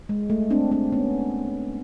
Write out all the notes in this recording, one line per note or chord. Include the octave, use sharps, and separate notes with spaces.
G#3
A3
C4 D4
C4 D4
B3 C#4